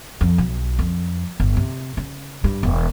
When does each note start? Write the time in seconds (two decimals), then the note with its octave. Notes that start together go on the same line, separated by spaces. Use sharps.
0.21 F2
0.38 B1
0.79 F2
1.40 G1
1.57 C3
1.97 C#3
2.44 G2
2.63 E1